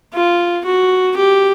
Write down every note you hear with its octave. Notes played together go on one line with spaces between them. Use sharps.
F4
F#4
G4